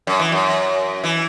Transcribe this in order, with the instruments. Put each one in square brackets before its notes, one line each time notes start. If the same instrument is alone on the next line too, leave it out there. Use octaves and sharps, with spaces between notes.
[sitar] F#2
E3
F#2
E3